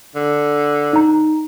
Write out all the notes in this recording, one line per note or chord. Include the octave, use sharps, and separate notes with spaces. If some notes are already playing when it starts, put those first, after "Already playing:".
D3
D#4 A#5